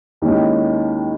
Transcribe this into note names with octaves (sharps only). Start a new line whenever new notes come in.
D#2 D#3 G#3 C#4 E4